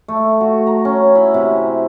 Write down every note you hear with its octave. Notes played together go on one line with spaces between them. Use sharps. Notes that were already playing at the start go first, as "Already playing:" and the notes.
A3
F#4
A#5
C#4
E4
C3